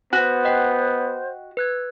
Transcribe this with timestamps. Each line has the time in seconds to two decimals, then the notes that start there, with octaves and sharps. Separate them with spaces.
0.13 B3 F#4 C5 F#5
0.45 D#5 F#5 G5
1.57 B4 F#6 G#6